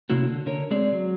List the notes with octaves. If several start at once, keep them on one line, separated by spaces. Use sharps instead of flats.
C3 A#3 C#4 E4 F#4
D3
D3 A#4 C#5
G#3 C4 G#4 D5
F#3